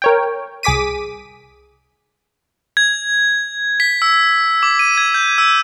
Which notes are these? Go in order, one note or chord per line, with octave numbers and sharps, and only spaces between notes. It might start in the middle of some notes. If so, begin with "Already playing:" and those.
A#4 C#5 G5
C2 G#4 D6 B6 D#7
G#6
B6
E6
D6
D#7
G#6
G6
E6